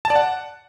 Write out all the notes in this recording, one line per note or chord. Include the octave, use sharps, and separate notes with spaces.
A5
D5
F#5